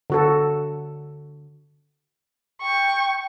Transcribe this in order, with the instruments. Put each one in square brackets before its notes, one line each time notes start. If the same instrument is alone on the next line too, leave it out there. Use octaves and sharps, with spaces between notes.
[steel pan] D3 F#4 A4
[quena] G5 [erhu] C#6